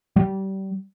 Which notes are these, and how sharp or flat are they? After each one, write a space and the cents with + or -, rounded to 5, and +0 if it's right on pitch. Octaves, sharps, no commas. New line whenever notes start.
G3 -25